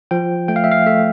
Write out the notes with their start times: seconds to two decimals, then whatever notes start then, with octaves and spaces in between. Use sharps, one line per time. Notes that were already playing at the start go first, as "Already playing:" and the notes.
0.11 F3 G5
0.48 A3 G5
0.56 F5
0.64 E5
0.72 F5
0.86 A3 E5